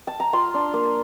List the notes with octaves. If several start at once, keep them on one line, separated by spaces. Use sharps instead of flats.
A5
A#5
F4 C6
D4
A#3